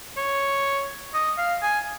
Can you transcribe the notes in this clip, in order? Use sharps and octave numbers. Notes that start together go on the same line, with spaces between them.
C#5
D#5
F5
G#5